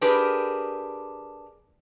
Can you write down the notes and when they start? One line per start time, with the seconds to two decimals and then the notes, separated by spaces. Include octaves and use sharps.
0.01 D4 G4 G#4 A#4 B4